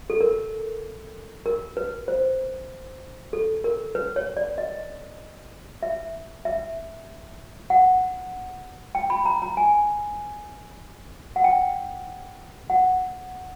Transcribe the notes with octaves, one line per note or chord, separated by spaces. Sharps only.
A4
A#4
A#4
B4
C5
A4
A#4
B4
C#5
D5
D#5
E5
E5
F#5
G5
B5
A#5
A#5
G#5
F#5
G5
F#5